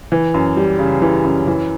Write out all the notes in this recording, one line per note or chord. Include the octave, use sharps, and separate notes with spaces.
E3
F#2
G3
C#3
E3
F#2
E3